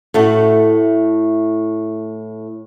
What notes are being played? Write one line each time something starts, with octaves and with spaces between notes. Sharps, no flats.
A2 A3 F#4